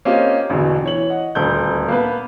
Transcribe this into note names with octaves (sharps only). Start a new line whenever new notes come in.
A#3 C4 C#4 F4 G4 D#5
A1 E2 B2 D3
E3 C#5 F#7
D#5 F#5
D#1 D2 G6
A#3 B3 B4